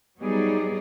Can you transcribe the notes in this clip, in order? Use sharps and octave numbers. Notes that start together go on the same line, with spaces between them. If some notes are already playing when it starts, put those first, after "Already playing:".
F#3 G3 B3 D#4 G#4 D5